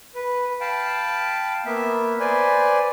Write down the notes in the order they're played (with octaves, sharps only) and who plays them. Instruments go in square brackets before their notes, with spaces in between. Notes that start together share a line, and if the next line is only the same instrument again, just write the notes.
[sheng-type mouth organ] B4
F5 G5 A5 B5
A#3 B3 E5
B4 C5 D5 G#5